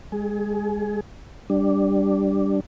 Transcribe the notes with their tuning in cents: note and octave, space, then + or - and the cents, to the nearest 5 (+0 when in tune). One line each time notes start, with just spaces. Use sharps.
G#3 -25 G#4 +25
G3 +0 D4 +0